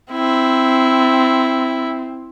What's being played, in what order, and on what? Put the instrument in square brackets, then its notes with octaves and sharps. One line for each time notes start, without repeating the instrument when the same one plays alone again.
[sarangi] C4 [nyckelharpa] E4